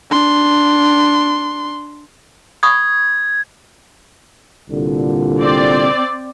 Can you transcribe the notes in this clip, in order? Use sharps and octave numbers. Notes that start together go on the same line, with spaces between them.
D4 C6
B5 C#6 D#6 G#6
C2 A#2 D3
C4 D5